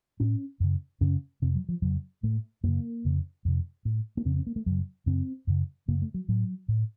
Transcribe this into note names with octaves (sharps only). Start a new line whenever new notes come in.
A2 C#4
F#2 C#3
F#2 C#3 C#4
F2 C3 C4
F#3
F3
F2 C#3 F#3
A2 A3
F#2 C#3 A#3
F2 C#3
F2 C3
A2
A#3
F2 C#3 C4
C4
A#3
A3
F#2 C#3 F#3
F#2 C#3 C4
F#2 C#3
F#2 C#3 A#3
A3
F#3
A2 F#3
A2